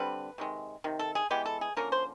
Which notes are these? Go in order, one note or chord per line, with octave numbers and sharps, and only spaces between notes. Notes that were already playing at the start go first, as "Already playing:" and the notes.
Already playing: D3 G3 C4 B4
C3 D#3 G#3
C3 D#3
A4
G#4
E3 G#3 B3 G4
A4
G#4
D3 F3 A#3 C#4 A#4
C5